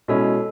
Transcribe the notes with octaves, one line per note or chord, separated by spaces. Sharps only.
B2 G#3 C#4 E4 A4